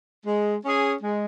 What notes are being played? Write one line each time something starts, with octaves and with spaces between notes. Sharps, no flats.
G#3
C#4 G#4
G#3